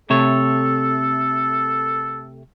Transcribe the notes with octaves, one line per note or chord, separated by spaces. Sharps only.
C3 A3 A4 C#5